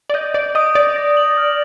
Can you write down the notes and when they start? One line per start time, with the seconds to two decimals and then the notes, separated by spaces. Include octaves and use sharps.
0.10 D5
0.14 D#5 G6
0.34 D5 D7
0.55 D#5 D#6
0.75 D5 A#6
0.96 A#6
1.17 F#7
1.37 F6